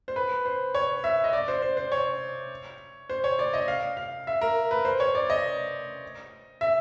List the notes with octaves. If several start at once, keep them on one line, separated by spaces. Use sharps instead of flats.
C5
B4
C5
C#5
E5
D#5
D5
C5
C5
C5
C#5
C5
C#5
D5
D#5
F5
F5
E5
A#4
B4
C5
C#5
D5
D#5
E5